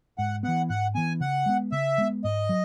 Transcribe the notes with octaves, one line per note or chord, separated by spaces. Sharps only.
G#2 F#5
E3 B3 F#5
G#2 F#5
E3 B3 G#5
C#3 F#5
G#3 B3
C#3 E5
G#3 B3
G#2 D#5
F#3